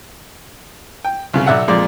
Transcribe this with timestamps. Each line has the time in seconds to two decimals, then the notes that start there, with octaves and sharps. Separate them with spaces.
1.05 G5
1.34 C2 C#3
1.46 B1 D5 E5 F#5
1.68 F2 A#2 G#3 D5